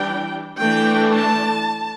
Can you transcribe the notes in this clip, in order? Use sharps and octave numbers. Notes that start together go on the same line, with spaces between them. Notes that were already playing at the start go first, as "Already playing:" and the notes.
Already playing: E3 G3 D4 G5
E3 A3 D4 G5
A5